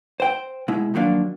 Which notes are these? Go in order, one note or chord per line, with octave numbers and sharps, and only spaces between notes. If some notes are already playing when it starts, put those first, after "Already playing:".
C5 G5
B2 G#3 E4
D#3 F3 F#3 A#3 D4